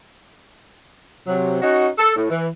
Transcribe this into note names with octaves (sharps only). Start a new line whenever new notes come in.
C3 F#3
C#4 D#4 F#4
A4
A2
E3